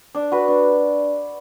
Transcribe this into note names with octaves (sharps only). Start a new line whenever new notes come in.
D4
F#4 B4
D4